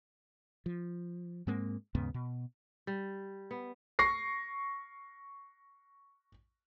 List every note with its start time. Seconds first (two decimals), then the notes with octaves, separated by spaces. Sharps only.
0.66 F3
1.47 G#2 G#3 A#3 C4
1.95 D#2 G#2 C#3 B3
2.14 B2
2.87 G3
3.51 B3
3.99 C#6 A#6 C7